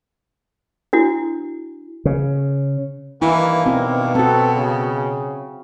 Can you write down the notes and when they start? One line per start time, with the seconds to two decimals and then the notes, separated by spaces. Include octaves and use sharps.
0.93 D4 E4 F#4
2.05 C#3
3.22 G2 D#3 E3 A#3 E4
3.66 B2 C4
4.15 B3 C4 F#4 A4
4.55 C#3